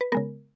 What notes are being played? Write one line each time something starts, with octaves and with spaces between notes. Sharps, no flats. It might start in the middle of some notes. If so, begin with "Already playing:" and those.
B4
C#3 G#3 B3 A#4